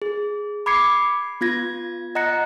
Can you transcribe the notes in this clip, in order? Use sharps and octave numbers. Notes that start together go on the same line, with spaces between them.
G#4
B5 D6 G#6 C7 C#7
B3 F4 G#6 A#6
D#5 F#5 A#5 F#6 A#6 C#7